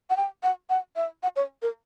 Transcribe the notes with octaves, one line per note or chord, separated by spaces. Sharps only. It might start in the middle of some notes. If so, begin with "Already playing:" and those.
F#5
G5
F#5
F#5
E5
F#5
C#5
A#4